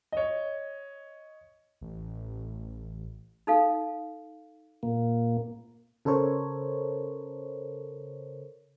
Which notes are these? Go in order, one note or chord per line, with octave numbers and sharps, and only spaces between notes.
C#5 D#5
A1
D#4 A4 F5
A#2 A#3
C#3 A4 A#4 C5 C#5